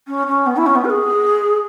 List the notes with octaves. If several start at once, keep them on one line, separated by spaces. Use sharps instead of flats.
C#4
C#4
B3
E4
C#4
B3
B4
G#4